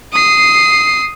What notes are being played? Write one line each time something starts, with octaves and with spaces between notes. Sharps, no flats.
D#6 C7